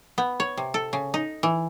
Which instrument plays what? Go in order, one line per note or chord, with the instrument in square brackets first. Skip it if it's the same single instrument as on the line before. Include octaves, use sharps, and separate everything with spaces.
[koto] B3
C#5
C3
A4
C#3
D#4
E3